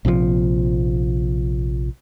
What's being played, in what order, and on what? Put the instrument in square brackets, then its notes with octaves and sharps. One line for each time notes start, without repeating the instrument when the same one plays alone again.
[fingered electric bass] A#1 C3 E3 F3